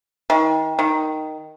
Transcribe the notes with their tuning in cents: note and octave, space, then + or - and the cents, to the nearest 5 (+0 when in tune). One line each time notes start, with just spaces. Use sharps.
D#3 +35
D#3 +0